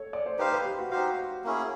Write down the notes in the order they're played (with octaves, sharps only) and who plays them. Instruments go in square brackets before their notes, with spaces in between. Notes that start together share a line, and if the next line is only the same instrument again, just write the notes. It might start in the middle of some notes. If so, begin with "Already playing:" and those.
Already playing: [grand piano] A4 C#5
D5
C5
[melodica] D#4 G4 C5 F5 [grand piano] B4
[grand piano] B4
G4
F#4
[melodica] D#4 G4 C5 F5 [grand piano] F#4
[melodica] A#3 C#4 E4 G#4